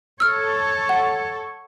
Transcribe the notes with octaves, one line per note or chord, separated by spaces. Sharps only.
A4 C#5 E6 F6
F#5